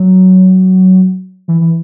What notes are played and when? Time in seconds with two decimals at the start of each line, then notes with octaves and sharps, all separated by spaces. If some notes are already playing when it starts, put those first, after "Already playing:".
Already playing: F#3
1.48 E3
1.61 E3